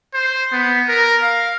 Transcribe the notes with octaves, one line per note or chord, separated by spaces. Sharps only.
C5
B3
A#4
F5